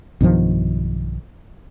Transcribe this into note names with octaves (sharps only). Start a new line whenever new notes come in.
B1 G2 D#3 F3